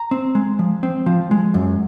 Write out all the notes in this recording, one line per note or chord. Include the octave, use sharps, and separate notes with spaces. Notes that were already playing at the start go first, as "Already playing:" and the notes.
Already playing: A#5
C4
G#3
F3
C4
F3
G#3
F#2